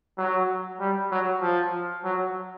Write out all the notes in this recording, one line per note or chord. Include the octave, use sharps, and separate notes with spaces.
F#3
G3
F#3
F3
F#3